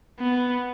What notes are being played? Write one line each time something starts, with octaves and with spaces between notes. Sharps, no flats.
B3